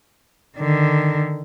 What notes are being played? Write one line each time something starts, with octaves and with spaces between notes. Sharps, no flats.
D3 D#3